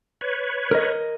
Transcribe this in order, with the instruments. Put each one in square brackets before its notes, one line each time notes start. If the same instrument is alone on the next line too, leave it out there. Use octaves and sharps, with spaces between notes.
[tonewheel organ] B4 C#5
[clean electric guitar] A#4 D#5